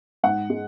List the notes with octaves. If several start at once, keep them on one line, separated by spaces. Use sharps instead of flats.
G#2 F#5
G#3